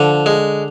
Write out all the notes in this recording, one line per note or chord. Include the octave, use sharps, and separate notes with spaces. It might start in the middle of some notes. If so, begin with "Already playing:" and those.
Already playing: D3 F3
G#3